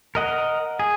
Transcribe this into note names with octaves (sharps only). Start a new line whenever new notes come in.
A#4 D#5 F#5
G#4